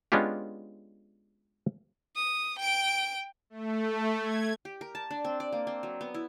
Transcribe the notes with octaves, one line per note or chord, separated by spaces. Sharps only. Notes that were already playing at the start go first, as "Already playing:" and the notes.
G#3 B3 C#4 D4 F4 G4
D#6
G5 D7
A3
G#6
G4
A#4
A5
D4
C4
D5
A#3
C4
F#3
B3
E4